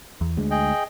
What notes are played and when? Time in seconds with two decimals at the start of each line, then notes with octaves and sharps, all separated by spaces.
0.21 E2
0.37 D2 G#3
0.51 G#4 D#5 G5